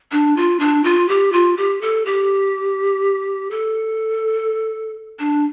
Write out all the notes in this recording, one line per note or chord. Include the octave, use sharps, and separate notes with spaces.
D4
F4
D4
F4
G4
F4
G4
A4
G4
A4
D4